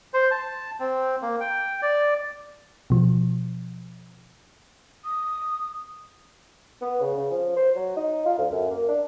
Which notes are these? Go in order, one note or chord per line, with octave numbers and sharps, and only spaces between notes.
C5
A5
C4
A#3
G5
D5
B2 F3
D#6
B3
C#3
C#3
F3
C5
F#3
D#4
F4
D2
F#2
A#3
D4